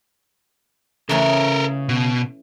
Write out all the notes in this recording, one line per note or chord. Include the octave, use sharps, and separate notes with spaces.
C#3 E3 A3 C#4 A4 A#4
B2